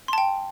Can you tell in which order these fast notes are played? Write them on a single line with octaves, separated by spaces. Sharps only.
C6 A5 G5